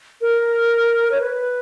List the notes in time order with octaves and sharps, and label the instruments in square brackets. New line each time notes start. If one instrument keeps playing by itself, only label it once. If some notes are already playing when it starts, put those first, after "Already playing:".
[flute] A#4
C#5
B4